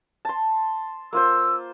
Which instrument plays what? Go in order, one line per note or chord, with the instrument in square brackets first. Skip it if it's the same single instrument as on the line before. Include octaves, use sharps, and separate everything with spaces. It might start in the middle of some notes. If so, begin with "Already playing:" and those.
[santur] A5 C6
[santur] A#3 F4 C5 [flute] E6